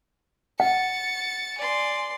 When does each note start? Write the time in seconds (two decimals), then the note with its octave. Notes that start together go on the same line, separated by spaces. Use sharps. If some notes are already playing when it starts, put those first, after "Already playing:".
0.60 F#5 A6 C#7
1.58 D5 G#5 C6